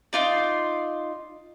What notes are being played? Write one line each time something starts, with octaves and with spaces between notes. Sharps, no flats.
D#4 F4 D5